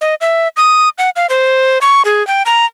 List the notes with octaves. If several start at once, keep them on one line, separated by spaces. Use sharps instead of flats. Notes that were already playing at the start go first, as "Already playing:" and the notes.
D#5
E5
D#6
F#5
F5
C5
C#6
G#4
G5
A#5